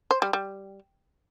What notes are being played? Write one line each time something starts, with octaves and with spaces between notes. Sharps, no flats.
C5
G3
G3